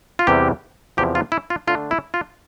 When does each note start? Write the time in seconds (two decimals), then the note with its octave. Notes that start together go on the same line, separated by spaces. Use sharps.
0.19 F4
0.27 E2 C3 E3 G3 G4
0.97 E2 C3 F3 G4
1.15 F4
1.32 E4
1.50 F4
1.67 D3 A3 D4 F4
1.91 E4
2.14 F4